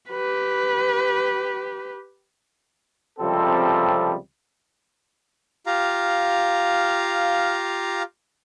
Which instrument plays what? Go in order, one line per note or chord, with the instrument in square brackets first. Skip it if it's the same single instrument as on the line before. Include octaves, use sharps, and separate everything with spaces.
[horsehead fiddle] G4 B4
[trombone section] C#2 C3 F3 G3 C4 A4
[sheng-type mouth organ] F4 G4 F5 A#5